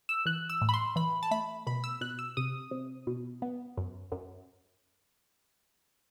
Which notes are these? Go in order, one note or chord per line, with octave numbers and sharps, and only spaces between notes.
E6
E3 F#6
E6
A2
B5
C6
E3 B5
A5
A3 B5
B2 B5
E6
B2 F#6
E6
C3 D#6
C3
B2
B3
F#2
F#2